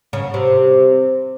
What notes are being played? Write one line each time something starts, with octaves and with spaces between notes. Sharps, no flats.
C#3
C3